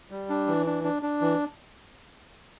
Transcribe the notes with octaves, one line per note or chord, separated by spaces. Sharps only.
G3
D4
E3
D4
D4
D4
E3